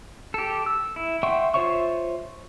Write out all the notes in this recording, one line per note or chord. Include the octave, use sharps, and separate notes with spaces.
G4 A4
E6
E4
E5 F#5 G5 C6 C#6
F4 C5 C#5 E5 C#6